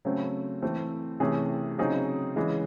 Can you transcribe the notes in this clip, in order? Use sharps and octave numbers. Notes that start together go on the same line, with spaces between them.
C#3 F#3 A3 C4
E3 A3 C4
C3 E3 A3 C#4 G#4
C#3 F#3 C4 D#4 G#4
C#3 E3 G#3 C#4